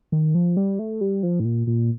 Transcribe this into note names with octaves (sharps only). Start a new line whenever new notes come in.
D#3
F3
G3
A3
G3
F3
A2
A#2
A#2